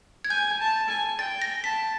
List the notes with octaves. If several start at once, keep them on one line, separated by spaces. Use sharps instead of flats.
G#6
G#5 G6
A5
G#5
G5 A6
A#6
A5 B6